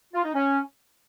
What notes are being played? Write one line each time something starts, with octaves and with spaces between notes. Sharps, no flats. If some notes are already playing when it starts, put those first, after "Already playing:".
F4
D#4
C#4